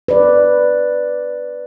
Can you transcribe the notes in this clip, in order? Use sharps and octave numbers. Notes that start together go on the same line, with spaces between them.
B4 D5